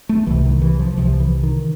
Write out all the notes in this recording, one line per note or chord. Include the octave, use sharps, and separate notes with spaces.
A3
C2 C3 E3
D#3
E3
F3
C2 C3 F3
E3
D#3